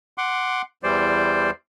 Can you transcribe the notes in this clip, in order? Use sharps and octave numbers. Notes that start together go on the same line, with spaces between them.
F#5 C6 D6
E2 E3 G3 C5 D5